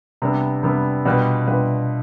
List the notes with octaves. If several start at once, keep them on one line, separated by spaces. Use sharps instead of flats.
C3 G3 B3 D4
C3 G3 B3 D4
B2 G3 D4 F4 B4
B2 G3 D4 F4 B4